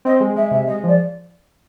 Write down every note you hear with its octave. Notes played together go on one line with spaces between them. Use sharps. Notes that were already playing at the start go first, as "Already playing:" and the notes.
C4 D#5
G#3
G#3 E5
C3 E5
G#3 D#5
F3 D5